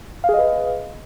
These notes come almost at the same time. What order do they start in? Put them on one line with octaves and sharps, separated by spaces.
F5 G#4 D#5 B4